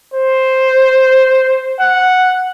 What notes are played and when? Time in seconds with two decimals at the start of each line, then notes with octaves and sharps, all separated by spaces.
0.14 C5
1.80 F#5